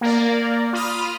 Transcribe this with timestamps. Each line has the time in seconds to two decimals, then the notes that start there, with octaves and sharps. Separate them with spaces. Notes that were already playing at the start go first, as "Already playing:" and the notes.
0.01 A#3 A#4 D5
0.73 F4 B5 D#6 F6